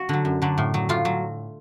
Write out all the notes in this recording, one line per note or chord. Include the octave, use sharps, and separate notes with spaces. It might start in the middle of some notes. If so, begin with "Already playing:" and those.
Already playing: F#4
D3 F#3
F#2
D3 F#3
A2
F#3
A2 F4
F#3